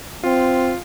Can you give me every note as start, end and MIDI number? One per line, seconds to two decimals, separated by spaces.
0.24 0.73 60
0.24 0.78 65